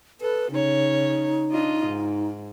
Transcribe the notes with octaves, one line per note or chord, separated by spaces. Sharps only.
A4 B4
C#3 D#4 C#5
D4 F4 D#5
G#2